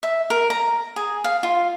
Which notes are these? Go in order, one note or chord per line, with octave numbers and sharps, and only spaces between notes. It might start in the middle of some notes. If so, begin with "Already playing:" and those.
E5
A#4
A#5
G#4
F5
F4